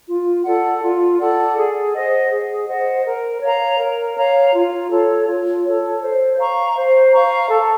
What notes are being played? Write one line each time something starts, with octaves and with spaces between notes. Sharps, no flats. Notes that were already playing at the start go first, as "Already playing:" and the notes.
F4
A4 D5 F#5
F4
A4 D5 F#5
G#4
C5 D#5 F#5
G#4
C5 D#5 F#5
A#4
C#5 F5 A#5
A#4
C#5 F5 A#5
F4
A4 C#5
F4
A4 C#5
C5
F5 A#5 C#6
C5
F5 A#5 C#6
A4